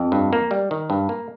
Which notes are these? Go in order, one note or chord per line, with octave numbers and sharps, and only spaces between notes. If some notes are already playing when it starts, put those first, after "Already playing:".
Already playing: F2
G2
A#3
G3
D#3
G2
A#3